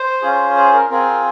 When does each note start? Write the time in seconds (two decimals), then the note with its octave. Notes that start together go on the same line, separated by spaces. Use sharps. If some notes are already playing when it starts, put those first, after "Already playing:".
Already playing: C5
0.22 C#4 F4 G#4
0.55 C5
0.73 A#4
0.90 C4 F4 G#4 A#4